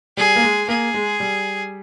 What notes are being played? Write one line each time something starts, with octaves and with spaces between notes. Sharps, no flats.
G3 G#4
A#3
G#3
A#3 G#4
G#3
G3